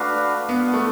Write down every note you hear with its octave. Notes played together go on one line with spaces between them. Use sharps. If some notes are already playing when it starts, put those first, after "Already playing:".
Already playing: A3 D4 F#4 B4 F5
B3 D4 F#4 B4 F5
A3